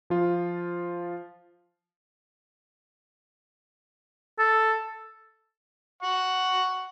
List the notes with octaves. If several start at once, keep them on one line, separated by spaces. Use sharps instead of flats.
F3 F4
A4
F#5 C#6